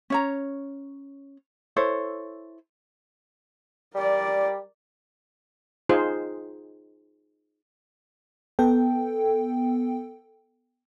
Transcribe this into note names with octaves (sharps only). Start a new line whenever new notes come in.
C#4 C#5 A#5
E4 A4 C5 C#5
G3 A#4 D5
D#4 F4 G#4 C5
B3 A4 G5